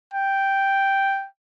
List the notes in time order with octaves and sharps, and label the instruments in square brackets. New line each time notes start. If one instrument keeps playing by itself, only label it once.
[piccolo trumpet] G5